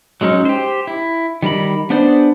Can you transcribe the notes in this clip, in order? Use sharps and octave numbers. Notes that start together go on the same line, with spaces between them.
F#3 G#3 C#4 D#4
G4 C5
E4
D#3 G3 A#4 B5
B3 D4 G#4 C5 D5